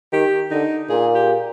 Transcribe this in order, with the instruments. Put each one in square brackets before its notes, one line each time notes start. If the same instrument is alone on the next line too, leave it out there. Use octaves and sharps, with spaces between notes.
[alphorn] D#3 [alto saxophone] G4
[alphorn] D3 [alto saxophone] D#4
[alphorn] A#2 [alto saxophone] G#4
[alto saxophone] G4